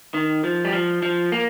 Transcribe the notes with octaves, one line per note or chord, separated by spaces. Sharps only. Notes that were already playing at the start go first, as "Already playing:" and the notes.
D#3
F3
G3
F3
F3
A#3